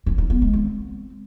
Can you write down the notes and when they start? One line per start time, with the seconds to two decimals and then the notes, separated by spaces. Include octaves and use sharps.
0.06 C#4
0.18 D#4
0.30 B3
0.42 G#3
0.53 C4